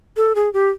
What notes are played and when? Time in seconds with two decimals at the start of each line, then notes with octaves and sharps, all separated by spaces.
0.17 A4
0.35 G#4
0.53 G4